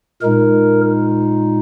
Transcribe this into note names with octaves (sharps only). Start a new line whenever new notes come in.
A#2 G#3 D#4 A#4